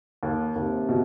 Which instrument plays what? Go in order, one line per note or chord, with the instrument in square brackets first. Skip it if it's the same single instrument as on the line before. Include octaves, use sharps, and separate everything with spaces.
[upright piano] D#2
[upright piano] D#2 [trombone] C3
[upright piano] B2